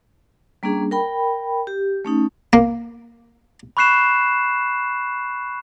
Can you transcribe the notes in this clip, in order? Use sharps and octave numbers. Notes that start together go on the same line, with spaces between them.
G3 A#3 C#4 D4 G#4
A#4 G5 B5
G4
A3 C#4 D#4
A#3
B5 C#6 F#6 C7 E7